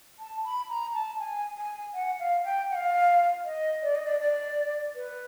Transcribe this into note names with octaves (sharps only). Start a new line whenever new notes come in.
A5
B5
A#5
A5
G#5
G#5
F#5
F5
G5
F#5
F5
D#5
D5
D#5
D5
D5
B4